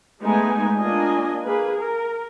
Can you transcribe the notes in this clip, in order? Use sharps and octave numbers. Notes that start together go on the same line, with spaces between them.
G#3 A3 B3 D#4 G#5
A#3 D4 F4 D#5 G#5
A#3 G#4 B4
A#4